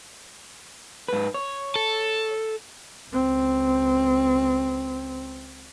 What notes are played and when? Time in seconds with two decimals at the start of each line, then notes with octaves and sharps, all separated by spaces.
1.08 G#2 B4
1.34 C#5
1.76 A4
3.11 C#2 C4